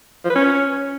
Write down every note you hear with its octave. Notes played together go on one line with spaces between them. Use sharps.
F3
B4
C#4